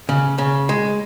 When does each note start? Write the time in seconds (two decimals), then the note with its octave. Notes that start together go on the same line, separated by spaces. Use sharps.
0.09 C#3
0.38 C#3
0.69 G#3